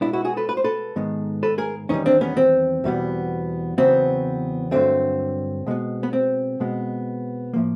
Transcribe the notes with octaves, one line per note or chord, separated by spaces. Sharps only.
B2 G#3 B3 D4 E4
E4 F#4
F#4 G#4
A4 B4
B4
C5
A4 B4
G#2 D#3 G#3 B3
A4 B4
G#4 A#4
E2 C3 D#3 G3 C#4 D#4
C4 D4
B3 C#4
C4
E2 B2 G3 B3
E2 C#3 F#3 B3 C4
G2 D3 F#3 A3 C4
B2 G#3 B3
B3
C4
B2 G#3 B3
A2 F3 A#3